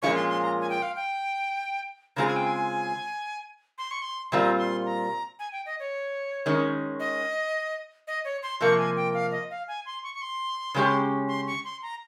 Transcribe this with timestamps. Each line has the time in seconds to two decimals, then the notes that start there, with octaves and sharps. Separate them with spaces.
0.02 A#2 F3 G#3 C#4 F4 C#6
0.15 C6
0.29 C6
0.42 A#5
0.61 G#5
0.70 G5
0.82 F5
0.96 G5
2.16 C#3 G#3 C4 F4 G#4 A#5
2.27 G#5
2.36 G5
2.46 G#5
3.78 C6
3.91 C#6
4.02 C6
4.32 A#2 G3 C4 F4 A#5
4.58 C6
4.85 A#5
5.39 G#5
5.52 G5
5.66 D#5
5.80 C#5
6.46 D#3 G#3 C#4
7.00 D#5
8.07 D#5
8.25 C#5
8.43 C6
8.61 C3 F3 A#3 C#6
8.78 G#5
8.96 G5
9.14 F5
9.32 D#5
9.51 F5
9.68 G#5
9.86 C6
10.03 C#6
10.14 C#6
10.21 C6
10.74 C#3 G#3 C#4 G4
11.28 C6
11.47 C#6
11.64 C6
11.82 A#5